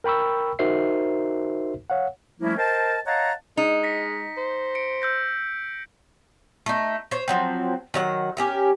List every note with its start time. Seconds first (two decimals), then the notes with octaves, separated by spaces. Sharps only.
0.04 A#4 G5 B5 C#6 E6
0.59 D#4 F#4 A#4 C5 E5 C7
1.90 C#5 F5 F#5
2.40 F3 G3 A3 A#3 C#4 E4
2.56 A#4 C5 D#5 G5 A5
3.06 C#5 D#5 F5 F#5 A5 A#5
3.57 G#3 D#4
3.83 A#6 B6 C#7
4.37 C5
4.75 C#7 D7
5.02 E6 G6 A#6
6.66 A3 D#4
7.11 C5 C#5
7.28 F3 F#3 C4
7.94 D#3 F#3 F#5
8.37 C#4 G4 A#4